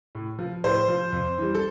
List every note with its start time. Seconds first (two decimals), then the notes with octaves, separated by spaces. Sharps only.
0.15 A2
0.39 F3
0.64 A2 C5
0.88 F3
1.12 F2
1.38 E3 G3
1.55 A4